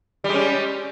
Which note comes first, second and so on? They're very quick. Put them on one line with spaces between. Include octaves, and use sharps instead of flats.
G3 G#3 C#4